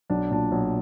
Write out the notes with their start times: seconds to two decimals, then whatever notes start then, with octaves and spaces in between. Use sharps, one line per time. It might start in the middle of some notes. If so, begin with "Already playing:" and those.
0.10 B1 D4
0.31 A#2 D4
0.52 B1